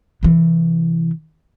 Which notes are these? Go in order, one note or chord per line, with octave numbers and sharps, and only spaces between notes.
C3 E3